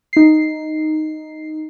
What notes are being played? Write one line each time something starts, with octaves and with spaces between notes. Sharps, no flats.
D#4 C7